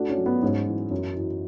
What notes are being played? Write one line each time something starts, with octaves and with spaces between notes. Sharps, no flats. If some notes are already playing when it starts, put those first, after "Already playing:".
Already playing: A3 D4 F#4
C#4
F#3
B3
G#2 C#4
E3
F#2
E3